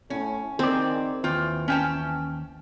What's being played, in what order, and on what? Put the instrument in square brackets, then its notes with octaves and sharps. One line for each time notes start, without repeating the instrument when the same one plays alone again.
[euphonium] A2 [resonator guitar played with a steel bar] C#4
[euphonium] D#3 [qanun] C4 [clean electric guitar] G#4 D5
[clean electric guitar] D#2 [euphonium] E3 [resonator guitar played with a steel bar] F4 G5
[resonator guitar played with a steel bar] C#4 G5 A5